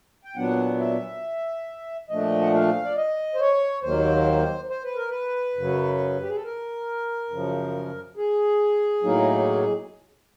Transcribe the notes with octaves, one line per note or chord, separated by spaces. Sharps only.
G5
A#2 F#3 B3 D4 F#5
E5
A#2 F3 A3 D4 D#5
F#5
F5
D5
D#5
C5
C#5
D#2 D#3 F#3 A#3 C5
C5
B4
A#4
B4
F#2 C#3 F#3
G4
G#4
A4
A#4
F#2 C#3 F3
G#4
A2 F#3 A#3 D#4